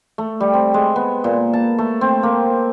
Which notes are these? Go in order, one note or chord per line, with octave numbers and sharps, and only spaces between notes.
A3
G3
C4
G#3
B3
A#2
A5
A3
C4
A#3